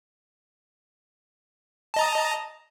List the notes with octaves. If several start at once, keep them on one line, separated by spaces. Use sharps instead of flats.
D#5 A5 A#5